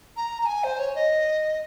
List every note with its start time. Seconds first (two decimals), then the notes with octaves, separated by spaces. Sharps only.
0.17 A#5
0.41 A#5
0.46 G#5
0.64 C5
0.79 C#5
0.95 D#5